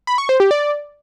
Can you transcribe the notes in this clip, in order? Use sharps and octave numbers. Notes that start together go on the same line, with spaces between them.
B5
C#6
C5
G4
D5